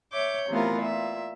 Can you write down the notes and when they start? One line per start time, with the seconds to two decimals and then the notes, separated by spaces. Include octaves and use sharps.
0.12 C#5 E5 D6 G6
0.49 C3 E3 A3 B3 F4 A#4
0.80 A#2 E5